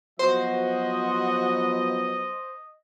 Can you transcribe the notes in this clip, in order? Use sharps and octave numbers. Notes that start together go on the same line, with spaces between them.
F3 F#3 B3 F#4 C5 D#5